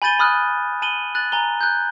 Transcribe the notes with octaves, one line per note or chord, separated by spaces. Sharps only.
G#5 B5 G6 A6 D#7 G7
B5 D#6 F6 F#6
A5 D#7 F#7 G7
F#6 A6 F#7
G#5 A#5 G7
F#6 G6